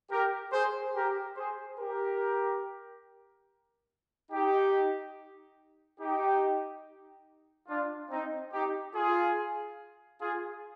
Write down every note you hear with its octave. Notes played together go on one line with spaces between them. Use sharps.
G4 A#4
G#4 C5
G4 A#4
G#4 C5
G4 A#4
D#4 G4
D#4 G4
D4 F4
C4 D#4
D#4 G4
F4 G#4
F4 G#4